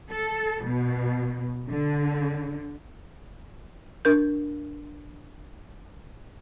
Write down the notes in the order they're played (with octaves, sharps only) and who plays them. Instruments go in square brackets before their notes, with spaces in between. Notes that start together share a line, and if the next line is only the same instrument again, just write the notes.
[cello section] A4
B2
D3
[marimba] D4 A#4 G6